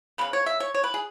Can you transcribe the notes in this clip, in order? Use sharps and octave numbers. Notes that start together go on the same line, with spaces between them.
C#3 G#3 B3 B4
C#5
E5
C#5
C#5
B4
G#4